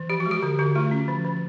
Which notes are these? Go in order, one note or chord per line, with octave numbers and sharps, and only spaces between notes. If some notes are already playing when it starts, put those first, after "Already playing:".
Already playing: E3
F3 G4
F#4
G#3
G4
D3 G4
D3 F#4
A3 F4
C#4
F3
F3